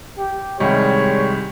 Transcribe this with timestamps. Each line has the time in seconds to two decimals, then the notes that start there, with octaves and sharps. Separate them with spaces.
0.18 G4
0.60 C2 D#3 G3 G#3 C#5